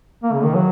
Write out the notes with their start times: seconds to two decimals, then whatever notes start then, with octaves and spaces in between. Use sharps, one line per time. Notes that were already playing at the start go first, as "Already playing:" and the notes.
0.23 A#3
0.33 C#3
0.44 D#3
0.55 F#3